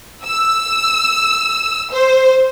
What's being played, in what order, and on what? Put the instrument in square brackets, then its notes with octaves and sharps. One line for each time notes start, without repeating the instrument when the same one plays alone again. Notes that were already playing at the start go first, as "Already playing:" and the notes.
[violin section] E6
C5